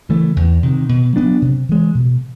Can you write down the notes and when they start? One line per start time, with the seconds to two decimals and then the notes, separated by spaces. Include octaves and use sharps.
0.09 C#3 E3 A3
0.36 E2
0.63 C3 D#3
0.89 B2
1.16 F#3 B3 D4
1.42 C3
1.69 E3 G#3
1.95 B2